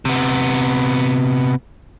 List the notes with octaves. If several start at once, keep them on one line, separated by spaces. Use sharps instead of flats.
C3 B3